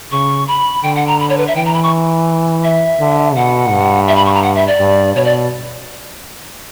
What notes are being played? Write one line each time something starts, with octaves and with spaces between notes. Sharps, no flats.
C#3 C#6
B5
D3 G5
F#5
A#5
B5
C#5
B4
E5
E3 G5
A#5
B5
C#6
E5
D3
B2 F#5
G2
E5
B5
C#6
A#5
F#5
E5
D5
G2
B2 C#5
D5